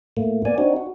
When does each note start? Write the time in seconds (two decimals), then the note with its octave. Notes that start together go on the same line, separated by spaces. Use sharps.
0.17 A2 A3 A#3
0.45 A#3 B3 D5 G#5
0.58 C4 D4 D#4 F#4
0.76 F#4